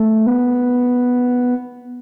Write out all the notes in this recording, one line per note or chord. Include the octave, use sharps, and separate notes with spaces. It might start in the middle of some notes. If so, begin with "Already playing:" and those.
Already playing: A3
B3